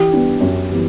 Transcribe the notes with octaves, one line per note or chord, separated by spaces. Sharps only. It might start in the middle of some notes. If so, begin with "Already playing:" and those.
Already playing: E3 G4
G3 B3 D4
F#2
E3 G3 B3